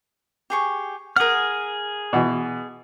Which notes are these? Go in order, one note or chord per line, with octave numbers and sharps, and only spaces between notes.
G4 G#4 C#6
G#4 A#4 F#5 F6
B2 E3